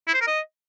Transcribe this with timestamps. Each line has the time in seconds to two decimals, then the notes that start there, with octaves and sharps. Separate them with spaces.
0.08 E4
0.15 C5
0.21 A#4
0.27 D#5